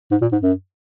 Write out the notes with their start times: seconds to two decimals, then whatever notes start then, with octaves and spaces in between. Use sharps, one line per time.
0.11 G#2
0.22 A#2
0.32 G#2
0.42 F#2